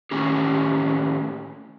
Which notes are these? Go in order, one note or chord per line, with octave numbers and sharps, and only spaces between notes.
A2 D#3 C#4 G4